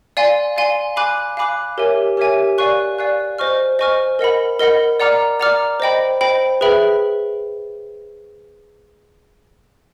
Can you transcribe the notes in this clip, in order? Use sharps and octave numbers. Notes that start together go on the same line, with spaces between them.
D5 F5 G#5 C6
D5 F5 G#5 C6
F5 G#5 B5 D6 F#6
F5 G#5 B5 D6 F#6
G4 A#4 C#5 E5 G#5
G4 A#4 C#5 E5 G#5
D5 F5 G#5 C#6 F#6
D5 F5 G#5 C#6 F#6
C5 D#5 G#5 C#6 F6
C5 D#5 G#5 C#6 F6
A#4 D#5 F#5 B5
A#4 D#5 F#5 B5
D5 F#5 A#5 D6 F6
D5 F#5 A#5 D6 F6
C5 D#5 G5 B5
C5 D#5 G5 B5
G#4 B4 E5 G5 B5